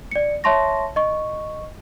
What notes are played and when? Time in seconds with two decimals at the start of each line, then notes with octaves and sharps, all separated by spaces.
0.11 D5 C#7
0.44 C#5 E5 A5 C6 C#6 A#6
0.96 D#5 C#6